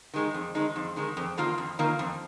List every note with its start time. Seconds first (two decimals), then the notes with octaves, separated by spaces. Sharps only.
0.14 D#3 G#3 D#4
0.34 F2
0.55 D#3 G#3 D#4
0.76 F2
0.96 D#3 G#3 D#4
1.17 F2
1.38 D#3 A#3 F4
1.58 F2
1.79 D#3 A#3 F4
1.99 F2